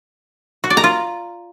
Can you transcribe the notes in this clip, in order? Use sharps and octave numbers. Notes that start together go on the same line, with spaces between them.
F#4
D5
A#5
F4